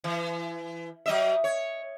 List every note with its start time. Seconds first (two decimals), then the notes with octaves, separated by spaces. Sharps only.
0.04 E3
1.06 F#3 D#5 E5
1.44 C#5